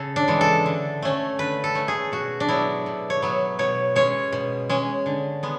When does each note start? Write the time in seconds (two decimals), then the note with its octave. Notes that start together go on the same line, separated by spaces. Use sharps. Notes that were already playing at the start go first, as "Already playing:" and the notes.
Already playing: C#3 A4
0.16 D4
0.28 E3 G#3
0.41 A4
0.66 D3
1.02 A3 C#4
1.39 D3 B4
1.64 A4
1.75 A3 C#4
1.88 G#4
2.12 B2 F#4
2.40 D4
2.49 F#3 B3 E4
2.86 B2
3.10 C#5
3.22 F#3 B3
3.59 B2 C#5
3.96 G#3 C#4 C#5
4.32 B2
4.70 G#3 C#4
5.06 D3
5.43 G#3 B3